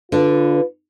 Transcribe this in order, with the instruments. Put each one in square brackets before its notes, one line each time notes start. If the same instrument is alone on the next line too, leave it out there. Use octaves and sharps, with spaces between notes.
[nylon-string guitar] D3 D4 [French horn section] F4 B4